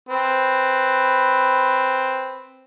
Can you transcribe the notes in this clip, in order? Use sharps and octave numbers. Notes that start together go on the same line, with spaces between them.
C4 B4